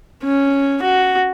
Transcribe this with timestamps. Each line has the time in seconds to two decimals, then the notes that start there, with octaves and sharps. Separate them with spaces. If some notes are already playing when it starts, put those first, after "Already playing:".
0.24 C#4
0.82 F#4